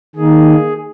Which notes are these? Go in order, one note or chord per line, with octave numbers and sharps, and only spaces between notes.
D#3 A#3 D#4 G#4